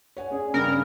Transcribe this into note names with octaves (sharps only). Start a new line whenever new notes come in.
C#5 F#5 G#5
C#4 G#4 D5
G2 C#3 G3 A#4